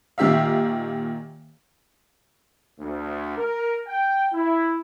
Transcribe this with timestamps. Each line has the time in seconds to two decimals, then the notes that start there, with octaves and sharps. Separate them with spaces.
0.18 A#2 D#3 G4 E5 F5
2.79 D2
3.37 A#4
3.87 G5
4.33 E4